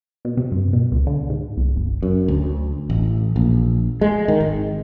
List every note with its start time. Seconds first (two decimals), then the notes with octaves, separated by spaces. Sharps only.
0.25 B2
0.37 C3
0.52 G2
0.73 B2
0.92 C#2
1.07 D3
1.30 G#2
1.57 C2
1.76 G1
2.03 F#2
2.28 D2
2.90 A1
3.36 A#1
4.01 G#3
4.28 D#3
4.40 G#1